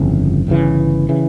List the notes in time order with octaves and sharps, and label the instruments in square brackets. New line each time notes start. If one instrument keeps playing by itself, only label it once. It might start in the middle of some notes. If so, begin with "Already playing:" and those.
Already playing: [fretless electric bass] G1 F2 C#3 E3
G1 F2 C#3 E3
C#3 E3